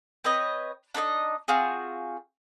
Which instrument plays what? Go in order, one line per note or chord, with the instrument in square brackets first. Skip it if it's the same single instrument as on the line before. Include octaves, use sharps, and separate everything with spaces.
[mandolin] C4 B4 C#5 D#5
D4 D#4 A#4 D#5
C4 F4 F#4 G#4